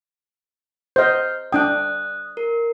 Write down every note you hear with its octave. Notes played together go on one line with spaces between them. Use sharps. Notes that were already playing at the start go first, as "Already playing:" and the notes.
C5 D#5 F6 G6
D4 G5 D#6 F#6
A#4